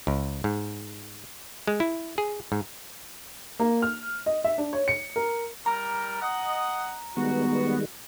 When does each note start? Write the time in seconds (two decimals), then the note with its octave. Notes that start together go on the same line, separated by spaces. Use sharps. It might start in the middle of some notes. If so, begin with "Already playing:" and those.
0.07 C#2
0.44 G#2
1.68 G#3
1.80 E4
2.18 G#4
2.52 G#2
3.60 A#3
3.82 F6
4.26 D#5
4.44 E5
4.58 D4
4.73 C#5
4.88 C#7
5.16 A#4
5.66 G3 A#4 A#5
6.22 D#5 F#5
7.17 D#3 G3 G#3 B3 F#4